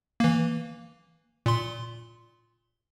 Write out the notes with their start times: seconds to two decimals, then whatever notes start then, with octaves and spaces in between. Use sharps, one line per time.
0.20 E3 A#3
1.46 A#2 C6